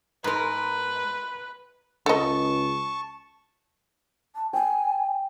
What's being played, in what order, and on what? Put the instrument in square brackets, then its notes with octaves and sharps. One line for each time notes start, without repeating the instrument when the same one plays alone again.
[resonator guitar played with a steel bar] G#2 A#4 [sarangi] B4 [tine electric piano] A#5 C6
[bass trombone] C#2 [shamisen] A4 D#5 [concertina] A5 C#6
[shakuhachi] A5
[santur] G5 [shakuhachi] G#5